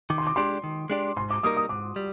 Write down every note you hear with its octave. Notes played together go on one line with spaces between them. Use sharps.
D#3 D6
C6
D6
G#3 D4 G4 D5 C6
D#3
G#3 D4 G4 D5
G#2 C6
D6
G3 A#3 D#4 A#4 D#6
D#6
G#2 D6
G3